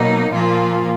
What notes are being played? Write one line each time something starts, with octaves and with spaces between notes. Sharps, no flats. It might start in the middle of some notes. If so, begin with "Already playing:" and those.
Already playing: B2 F#3 A#3 D#4
A#2 F3 A#3 F4